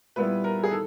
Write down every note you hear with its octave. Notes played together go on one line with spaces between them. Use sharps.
A#2 G3 B3 E4 B4
A#4
G#4
D#3 A4